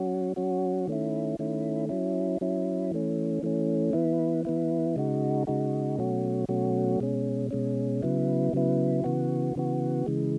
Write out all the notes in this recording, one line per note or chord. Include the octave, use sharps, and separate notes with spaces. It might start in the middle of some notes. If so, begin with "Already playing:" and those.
Already playing: F#3 C#4 F#4
F#3 C#4 F#4
D#3 A3 C#4 E4
D#3 A3 C#4 E4
F#3 C#4 E4
F#3 C#4 E4
E3 A3 C#4
E3 A3 C#4
E3 B3 E4
E3 B3 E4
C#3 G#3 D#4 F#4
C#3 G#3 D#4 F#4
B2 F#3 A3 C#4 F#4
B2 F#3 A3 C#4 F#4
B2 G#3 C#4
B2 G#3 C#4
C#3 F#3 B3 E4
C#3 F#3 B3 E4
C#3 E3 B3 F#4
C#3 E3 B3 F#4
C#3 E3 G#3